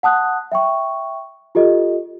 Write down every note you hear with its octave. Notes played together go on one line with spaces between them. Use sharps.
F#5 A5 D#6 F#6
E5 G5 C#6
F4 G4 A4 D#5